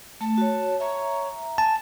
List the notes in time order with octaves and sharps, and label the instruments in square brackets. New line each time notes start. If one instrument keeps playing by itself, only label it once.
[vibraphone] A3 [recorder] A5
[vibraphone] F#4 C#5
[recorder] C#5 [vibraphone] E5 A#5
[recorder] G#5 [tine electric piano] A5